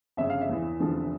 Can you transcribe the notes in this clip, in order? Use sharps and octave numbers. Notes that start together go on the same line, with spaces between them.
G1 F2 C#3 E5
F5
E5
E2 E3
F1 E2 D3 F3